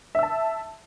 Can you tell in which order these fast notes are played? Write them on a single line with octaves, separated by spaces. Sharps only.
E5 E6 A5